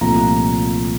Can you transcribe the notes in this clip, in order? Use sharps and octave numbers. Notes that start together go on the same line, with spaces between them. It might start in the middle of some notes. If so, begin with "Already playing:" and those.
C2 A#2 F3 A3 A#5